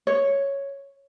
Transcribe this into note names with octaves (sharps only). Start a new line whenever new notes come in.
C#5